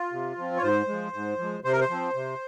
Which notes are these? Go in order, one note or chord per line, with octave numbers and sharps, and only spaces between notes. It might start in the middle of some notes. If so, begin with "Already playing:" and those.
Already playing: F4
C3
F3 C4
C#5
G#2 C5
F3 G#3
G#2
F3 G#3
C3 C5
A#4
C5
F3 C4
C3